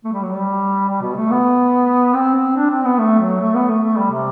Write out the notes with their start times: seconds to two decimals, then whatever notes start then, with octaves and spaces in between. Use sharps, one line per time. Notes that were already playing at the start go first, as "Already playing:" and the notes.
0.04 A3
0.13 G3
0.22 F#3
0.32 G3
0.88 G3
1.02 B2
1.16 A3
1.31 B3
2.14 C4
2.35 C4
2.57 D4
2.70 C4
2.85 B3
2.99 A3
3.20 F#3
3.40 A3
3.55 B3
3.69 A3
3.83 A3
3.97 G3
4.11 C3